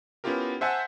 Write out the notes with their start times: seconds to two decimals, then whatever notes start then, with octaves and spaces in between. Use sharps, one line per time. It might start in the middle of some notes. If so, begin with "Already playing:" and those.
0.24 B3 C#4 E4 F4 G4 A#4
0.61 C5 E5 F#5 G#5 A5